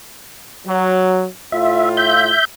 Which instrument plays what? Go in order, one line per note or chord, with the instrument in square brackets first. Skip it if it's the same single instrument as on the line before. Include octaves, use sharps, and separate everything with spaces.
[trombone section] F#3
[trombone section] A2 F4 [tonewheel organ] E5
[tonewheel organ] E5 G6